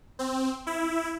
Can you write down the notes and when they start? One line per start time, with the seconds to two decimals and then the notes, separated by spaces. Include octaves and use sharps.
0.19 C4
0.67 E4